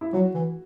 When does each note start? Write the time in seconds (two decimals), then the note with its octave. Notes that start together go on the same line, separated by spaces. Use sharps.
0.01 E4
0.13 F#3 F#4
0.34 E3